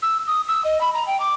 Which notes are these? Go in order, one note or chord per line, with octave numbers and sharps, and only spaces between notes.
E6
D#6
E6
D#5
B5
A#5
G5
D6